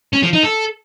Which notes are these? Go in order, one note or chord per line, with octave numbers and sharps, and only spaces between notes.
C#4
F3
D#4
A4